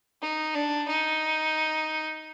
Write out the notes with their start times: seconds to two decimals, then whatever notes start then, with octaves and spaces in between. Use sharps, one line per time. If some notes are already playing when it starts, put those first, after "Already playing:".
0.21 D#4
0.54 D4
0.88 D#4